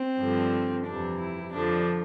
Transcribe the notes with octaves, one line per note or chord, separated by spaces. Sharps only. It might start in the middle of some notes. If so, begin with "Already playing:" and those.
Already playing: C4
G2 D3 F3
F2 C3 E3 D4
E4
F2 D3 F3 D4